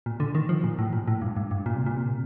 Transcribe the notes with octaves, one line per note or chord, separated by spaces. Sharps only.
A#2
D3
D#3
F3
A#2
A2
A#2
A2
G2
G2
G2
A#2
C3
A#2
C3
A#2